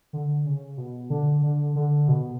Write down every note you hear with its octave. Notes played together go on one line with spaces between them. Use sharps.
D3
C#3
B2
D3
D3
D3
B2